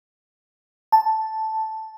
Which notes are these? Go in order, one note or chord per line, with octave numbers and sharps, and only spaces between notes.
A5